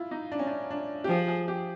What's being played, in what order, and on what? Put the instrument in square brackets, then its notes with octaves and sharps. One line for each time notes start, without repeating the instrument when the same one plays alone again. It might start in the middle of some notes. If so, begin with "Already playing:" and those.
Already playing: [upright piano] E4 F4
D#4
D4
C#4
D4
D4
G4
[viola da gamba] F3 [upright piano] G#4
[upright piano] G#4
G4